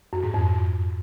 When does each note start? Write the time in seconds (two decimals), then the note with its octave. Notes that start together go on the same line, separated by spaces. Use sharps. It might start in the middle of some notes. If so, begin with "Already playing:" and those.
0.13 F#2
0.23 G#2
0.34 F2